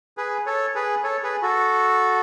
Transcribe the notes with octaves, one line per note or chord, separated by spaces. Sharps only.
G#4 B4
A4 C#5
G#4 B4
A4 C#5
G#4 B4
F#4 A4